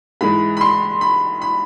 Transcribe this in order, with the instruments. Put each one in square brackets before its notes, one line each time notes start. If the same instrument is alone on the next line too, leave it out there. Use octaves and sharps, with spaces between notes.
[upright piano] G#2 E3 G#3 B5
B5
C6
B5
B5